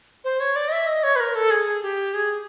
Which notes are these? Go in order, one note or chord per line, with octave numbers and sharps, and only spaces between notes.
C5
C#5
D5
D#5
E5
D#5
C#5
B4
A#4
A4
G#4
G4
G#4